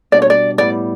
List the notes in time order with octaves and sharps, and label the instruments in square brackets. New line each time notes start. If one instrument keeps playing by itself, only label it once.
[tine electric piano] B2 G3 D4 [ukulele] D5
[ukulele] C#5
D5
[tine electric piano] A2 G3 B3 E4 [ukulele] D5